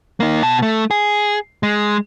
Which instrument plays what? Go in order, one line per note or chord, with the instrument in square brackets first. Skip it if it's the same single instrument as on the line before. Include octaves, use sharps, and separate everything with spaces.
[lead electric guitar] A#3 D#4
B2 A5
A3
G#4
G#3